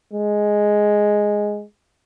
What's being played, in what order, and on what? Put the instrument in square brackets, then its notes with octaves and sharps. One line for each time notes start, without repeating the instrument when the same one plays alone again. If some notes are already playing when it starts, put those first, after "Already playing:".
[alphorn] G#3